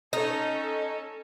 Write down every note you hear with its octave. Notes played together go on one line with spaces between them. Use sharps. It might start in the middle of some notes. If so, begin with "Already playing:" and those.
C#4 D#4 A4